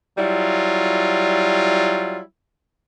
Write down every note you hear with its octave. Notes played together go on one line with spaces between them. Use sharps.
F#3 G3 E4 F4